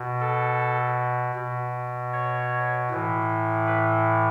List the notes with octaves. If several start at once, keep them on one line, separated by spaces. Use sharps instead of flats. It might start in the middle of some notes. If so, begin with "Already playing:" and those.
Already playing: B2
A4
B2
C#5
A2 E3
B4